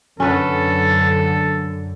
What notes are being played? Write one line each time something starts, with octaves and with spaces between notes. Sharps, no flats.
F#2 D3 C#4 A4 B4 F#5